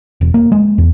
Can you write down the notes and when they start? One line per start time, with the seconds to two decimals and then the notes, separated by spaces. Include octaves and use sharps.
0.21 E1
0.34 A#3
0.52 G#3
0.78 E2